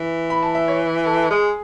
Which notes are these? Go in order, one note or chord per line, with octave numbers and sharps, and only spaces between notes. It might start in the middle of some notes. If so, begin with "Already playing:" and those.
Already playing: E3
B5
A5
E5
C#5
A4
G#3 G#4